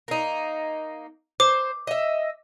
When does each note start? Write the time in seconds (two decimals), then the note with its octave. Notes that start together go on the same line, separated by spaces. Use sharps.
0.08 A#3 D#4
1.40 C5 D6
1.87 D#5 E5